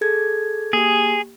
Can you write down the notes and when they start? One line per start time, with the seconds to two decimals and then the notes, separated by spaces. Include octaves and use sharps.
0.01 G#4 A4 G#6
0.73 A#3 G4 G#4